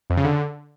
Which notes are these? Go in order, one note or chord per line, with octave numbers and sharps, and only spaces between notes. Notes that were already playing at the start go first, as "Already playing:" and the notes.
F2
C#3
D3